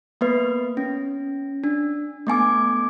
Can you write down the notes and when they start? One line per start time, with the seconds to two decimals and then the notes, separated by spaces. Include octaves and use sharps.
0.21 A#3 B3 B4
0.77 C#4
1.64 D4
2.27 A3 B3 G#5 D6